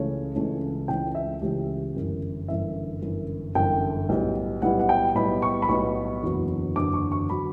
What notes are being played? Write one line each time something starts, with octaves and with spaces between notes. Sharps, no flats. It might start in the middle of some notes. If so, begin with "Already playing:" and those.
Already playing: C#2 C#3 E3 A3 C#4 C#5
C#2 C#3 E3 A3 C#4
C#2 C#3 E3 A3 C#4 G5
E5
C#2 C#3 E3 A3 C#4 G4
G1 F#2 E3
G1 F#2 E3 E5
G1 F#2 E3
G1 F#2 E3 G5
B1 A2 G3 B3 E4
B1 A2 G3 B3 E4 F#5
F#5
G5
B1 A2 G3 B3 E4 B5
C#6
B5
B1 A2 G3 B3 E4 C#6
F#1 E2 D3 F#3 B3
F#1 E2 D3 F#3 B3 D6
C#6
C#6
D3 F#3 B3 B5